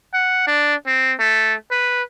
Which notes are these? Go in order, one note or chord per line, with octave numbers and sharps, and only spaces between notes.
F#5
D4
C4
A3
B4